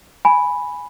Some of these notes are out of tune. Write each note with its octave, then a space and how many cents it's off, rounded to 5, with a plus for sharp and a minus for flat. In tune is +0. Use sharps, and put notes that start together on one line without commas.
G#5 +0 B5 +0